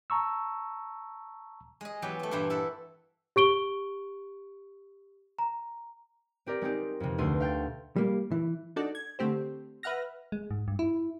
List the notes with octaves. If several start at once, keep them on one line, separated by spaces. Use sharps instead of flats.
A5 A#5 C#6 E6
G#3 D#5
E3 F#3 B3 G4
F#3 A3
G2 A#2 E3 E4 G4
E4 A4 E5 F#5
G4 C#6 D7 G7
A#5
C4 G4 A#4 D5
G#3 C4 D#4 G4
F2 C3
D2 B2 A3 C6 D#7
F5 G5 F6 A6
G3 A#3
E3
D4 D#4 F#4 A4 D5
G#6
D3 A3 C4 G4 C5
B4 E5 F#5 F6 A#6
G#3
G#2
G2
E4